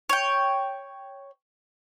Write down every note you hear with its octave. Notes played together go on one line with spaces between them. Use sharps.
C#5 G5